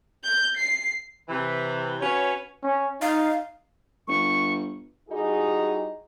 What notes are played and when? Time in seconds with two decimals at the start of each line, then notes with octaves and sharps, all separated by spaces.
0.24 G6
0.57 C7
1.29 C3 E3 B4
2.00 C#4 F#4 B4 C#5
2.64 C#4
3.01 D#4 F5
4.07 G1 C#6
5.09 G3 D#4 E4 F#4 G#4